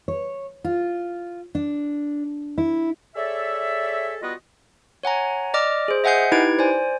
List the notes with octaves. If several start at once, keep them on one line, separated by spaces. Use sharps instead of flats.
C#5
F4
D4
E4
G#4 A4 C#5 D5 E5
G3 B3 F4 F#4 B4 D#5
C#5 F#5 G#5 A#5
D5 D#5 D6 F6
G#4 C5
D#5 E5 F#5 G#5 G6 C7
D#4 E4 G4 B4 G#6 D7
C5 D5 G#5